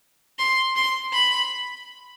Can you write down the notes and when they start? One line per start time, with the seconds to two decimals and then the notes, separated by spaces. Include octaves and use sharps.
0.39 C6
0.76 C6
1.13 B5